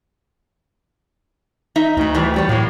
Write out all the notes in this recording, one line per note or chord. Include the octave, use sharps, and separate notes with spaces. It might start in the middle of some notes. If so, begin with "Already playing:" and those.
D#4 D#5 E5
D2 F#3 D#4
A2 E3 G3
E2 G3 C#5
A2 F#3 A#3